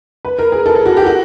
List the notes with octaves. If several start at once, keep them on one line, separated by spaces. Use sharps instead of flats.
B4
A#4
G#4
A4
G#4
F#4
G4
F#4